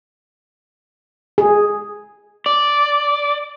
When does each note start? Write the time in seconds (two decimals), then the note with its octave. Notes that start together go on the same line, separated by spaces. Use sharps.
1.38 G#4
2.46 D5